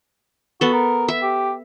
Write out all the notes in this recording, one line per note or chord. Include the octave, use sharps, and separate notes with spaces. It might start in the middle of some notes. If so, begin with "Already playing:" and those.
B3 F#4 A4
A#4
E5
G4